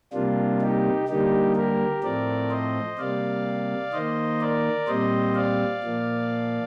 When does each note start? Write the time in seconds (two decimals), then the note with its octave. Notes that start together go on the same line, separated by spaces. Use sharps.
0.13 C3 G3 A#3 D4 F4
0.61 D#4 G4
1.09 D3 G3 A#3 D#4 G4
1.56 G4 A#4
2.03 A2 F3 A3 C4 A#4 D5
2.50 C5 D#5
2.98 C3 G3 A#3 D5 F5
3.93 D#3 A#3 C5 D#5
4.41 A#4 D5
4.87 A#2 G3 C4 C5 D#5
5.35 D5 F5
5.83 A#2 F3 A#3